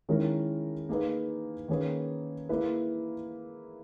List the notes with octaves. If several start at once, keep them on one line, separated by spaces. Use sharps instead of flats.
D#3 G#3 C#4 E4 A#4
A#3 D#4 G#4 B4
D#3 A#3 C#4 G#4 B4
A#3 E4 G#4 B4